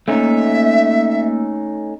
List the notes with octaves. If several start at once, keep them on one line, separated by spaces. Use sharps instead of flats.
A3 A#3 C#4 D#4 E5 E6